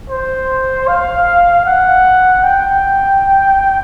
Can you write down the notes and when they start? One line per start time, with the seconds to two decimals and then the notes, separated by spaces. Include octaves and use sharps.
0.10 C5
0.88 F5
1.66 F#5
2.44 G5